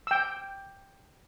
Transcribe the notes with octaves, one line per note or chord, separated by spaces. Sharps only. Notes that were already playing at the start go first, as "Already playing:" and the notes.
G5 E6